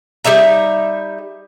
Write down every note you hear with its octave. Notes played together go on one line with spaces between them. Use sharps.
G3 D#4 E5 A#5